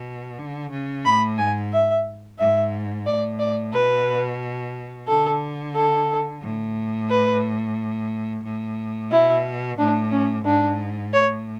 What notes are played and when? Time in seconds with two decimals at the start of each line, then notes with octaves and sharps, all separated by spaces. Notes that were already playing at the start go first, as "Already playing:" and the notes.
Already playing: B2
0.38 D3
0.71 C#3
1.05 A2 B5
1.38 G#2 G#5
1.73 E5
2.39 G#2 E5
3.07 A2 D5
3.40 D5
3.73 B2 B4
5.08 D3 A4
5.75 A4
6.42 A2
7.10 B4
8.44 A2
9.11 B2 E4
9.78 A2 D4
10.11 C#4
10.45 G#2 D4
11.13 A2 C#5